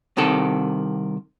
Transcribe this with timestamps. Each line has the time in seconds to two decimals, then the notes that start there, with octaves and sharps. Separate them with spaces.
0.17 C2 C3 D#3 A4